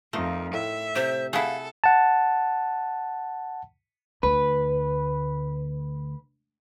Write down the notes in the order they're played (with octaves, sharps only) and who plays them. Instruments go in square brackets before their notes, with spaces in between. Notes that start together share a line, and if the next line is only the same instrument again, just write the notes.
[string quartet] F2 [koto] A3 [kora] D#4 F4 A#4
[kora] A2 [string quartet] E5
[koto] C3 G4 [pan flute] C5
[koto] A3 E4 [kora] G#4 F#5 [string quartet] A4 [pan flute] F5
[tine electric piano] F#5 A5
[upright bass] D2 [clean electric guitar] B4